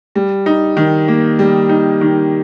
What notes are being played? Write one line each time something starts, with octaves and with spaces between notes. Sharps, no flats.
G3
D#4
D#3
A#3
G3
D#4
D#3